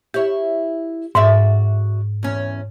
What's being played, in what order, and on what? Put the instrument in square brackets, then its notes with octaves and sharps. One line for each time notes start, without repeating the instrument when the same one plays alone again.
[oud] E4 C#5 [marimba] G4
[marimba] G#2 [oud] F#4 D5 E5
[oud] E2 C#4